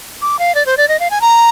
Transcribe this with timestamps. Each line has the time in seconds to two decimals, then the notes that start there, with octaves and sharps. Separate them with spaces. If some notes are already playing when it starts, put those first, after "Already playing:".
0.22 D6
0.39 F5
0.55 D5
0.66 C5
0.77 D5
0.88 D#5
1.00 F5
1.11 G#5
1.21 A#5